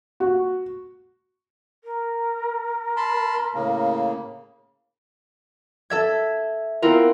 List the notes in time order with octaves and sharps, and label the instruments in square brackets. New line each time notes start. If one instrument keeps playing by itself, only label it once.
[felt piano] F#4
[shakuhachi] A#4
[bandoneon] A5 B5 C6
A2 C#3 A#3
[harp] A4 E5 G#6
B3 C4 E4 F4 A#4